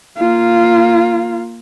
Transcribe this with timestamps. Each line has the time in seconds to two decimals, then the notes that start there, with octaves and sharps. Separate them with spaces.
0.17 A#3 F4